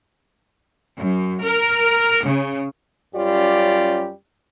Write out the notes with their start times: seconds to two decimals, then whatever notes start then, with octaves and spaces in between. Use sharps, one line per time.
0.98 F#2
1.44 A#4
2.24 C#3
3.14 F#2 G3 C#4 F4 G4 D5